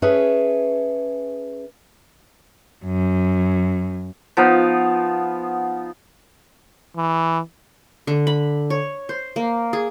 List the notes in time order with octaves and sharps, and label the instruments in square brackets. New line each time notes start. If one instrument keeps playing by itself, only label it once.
[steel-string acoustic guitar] C#4 G#4 B4 C#5 E5 A5
[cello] F#2
[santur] F3 B3 D#4 F5
[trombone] E3
[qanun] D3
B5
C#5
C5
A#3
G#4